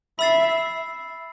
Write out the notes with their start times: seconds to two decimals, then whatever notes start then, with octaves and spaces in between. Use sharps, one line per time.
0.19 E5 B5 E6 A6 C7